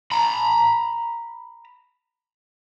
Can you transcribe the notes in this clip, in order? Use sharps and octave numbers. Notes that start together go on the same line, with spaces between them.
A#5 B5